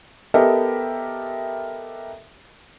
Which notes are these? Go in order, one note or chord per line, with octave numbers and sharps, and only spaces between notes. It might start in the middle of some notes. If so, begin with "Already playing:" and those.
B3 G4 A4 A#4 D#5 E5